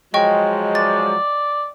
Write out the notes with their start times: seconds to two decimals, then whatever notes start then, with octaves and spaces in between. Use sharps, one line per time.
0.14 F3 F#3 G#3 D#5 G5 C#6
0.75 D5 A6